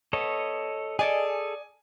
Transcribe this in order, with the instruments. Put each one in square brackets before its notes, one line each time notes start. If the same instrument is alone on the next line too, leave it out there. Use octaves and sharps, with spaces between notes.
[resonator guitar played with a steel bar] B3 [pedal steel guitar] A4 C#5 D#5
[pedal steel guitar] G#4 A4 [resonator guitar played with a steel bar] D5 D#5 [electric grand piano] G#5